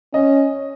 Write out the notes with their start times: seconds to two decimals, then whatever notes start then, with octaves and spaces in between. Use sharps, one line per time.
0.14 C#4 D#5